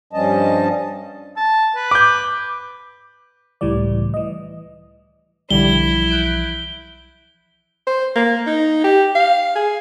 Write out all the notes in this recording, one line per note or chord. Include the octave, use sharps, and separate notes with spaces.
G2 F3 G3 C#4 D#5 A5
A5
B4
D6 G6
C#2 A2 E3 G3 D5
E3 D#5
B1 D3 E3 F3 G3 E4 G7
F#6 G6 D7
C5
A#3
D#4
G4
F5
G#4